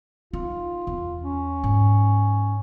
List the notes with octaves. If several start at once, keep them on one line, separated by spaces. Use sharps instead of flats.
D#4 F4
E2
C#4
G#2